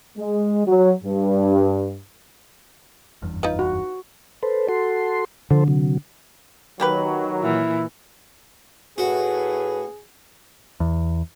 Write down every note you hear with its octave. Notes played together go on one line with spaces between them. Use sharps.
G#3
F#3
G2
F#1 E2 G2
D#4 F4 B4
F#4
A4 B4 C5
F#4 A4 C6
D3 F3 A4 C5
C3 F#3
D#3 F#3 A#3 G4 B4
A#2 E3 E4
A2 F#4 G#4 B4
E2